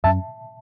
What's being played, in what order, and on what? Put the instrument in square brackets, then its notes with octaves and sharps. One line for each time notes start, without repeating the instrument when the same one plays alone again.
[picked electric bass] F#2 F#3 C#4 [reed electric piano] E5 A5